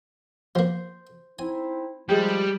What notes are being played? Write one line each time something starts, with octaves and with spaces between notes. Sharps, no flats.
F3 A#3 C5
C4 D#4 E4 G#5
F3 G3 G#3 G4 G#4